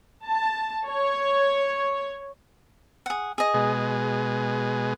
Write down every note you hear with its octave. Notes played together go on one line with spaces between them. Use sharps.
A5
C#5
G#4 F#5
G#4 D#5
B2 G#3